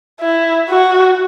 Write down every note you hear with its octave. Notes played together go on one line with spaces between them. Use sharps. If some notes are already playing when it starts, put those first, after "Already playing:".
E4
F#4